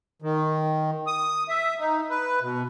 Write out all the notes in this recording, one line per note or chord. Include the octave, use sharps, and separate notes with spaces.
D#3
D#6
E5
D#4
B4
B2